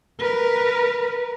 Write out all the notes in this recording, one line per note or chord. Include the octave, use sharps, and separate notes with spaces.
A#4 B4